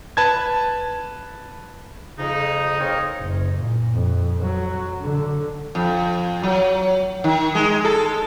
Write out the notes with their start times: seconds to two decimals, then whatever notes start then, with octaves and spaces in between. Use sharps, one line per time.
0.17 B4 A5 G#6
2.19 F2 C#3 D#4
2.80 A#3 C4 A#4 C#5 D#5
3.21 F#1
3.59 A#2
3.94 F2
4.41 F#3
5.02 D3
5.75 F2
6.43 F#3
7.24 D#3
7.55 G#3
7.85 A4